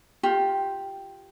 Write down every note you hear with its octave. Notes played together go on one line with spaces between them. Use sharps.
F4 G4